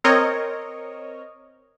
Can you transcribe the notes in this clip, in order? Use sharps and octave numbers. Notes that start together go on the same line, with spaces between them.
C4 A#4 C#5 D#5